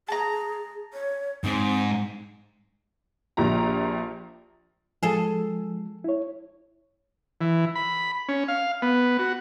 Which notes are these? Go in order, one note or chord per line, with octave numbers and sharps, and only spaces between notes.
G#4 A5 A#5
C#5
G#2 C4
A#1 A#2 F3 G4 A#5
F3 G#3 G#4 A4
E4 C#5
E3
B5
C#4
F5
B3
F#4